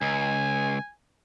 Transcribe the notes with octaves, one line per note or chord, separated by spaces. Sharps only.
C#2 G#5